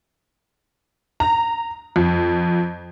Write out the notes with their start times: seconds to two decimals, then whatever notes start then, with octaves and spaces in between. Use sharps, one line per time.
1.20 A#5
1.96 F2